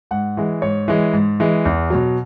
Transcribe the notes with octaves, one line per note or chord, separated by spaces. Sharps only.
G#2 F#5
E3 G#3
G#2 C#5
E3 G#3
G#2
E3 G#3
E2
B2 F#3